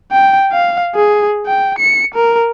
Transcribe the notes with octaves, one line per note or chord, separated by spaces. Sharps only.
G5
F5
G#4
G5
C#7
A#4